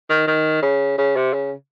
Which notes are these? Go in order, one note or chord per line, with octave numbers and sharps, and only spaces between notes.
D#3
D#3
C#3
C#3
C3
C#3